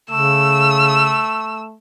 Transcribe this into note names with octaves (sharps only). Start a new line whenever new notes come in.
C#3 A3 E6